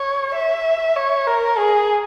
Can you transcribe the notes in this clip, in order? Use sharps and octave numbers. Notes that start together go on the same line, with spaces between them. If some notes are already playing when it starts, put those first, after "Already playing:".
Already playing: C#5
E5
C#5
A#4
G#4